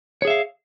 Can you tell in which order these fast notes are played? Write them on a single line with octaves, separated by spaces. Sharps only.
C#5 G#4 E5 F5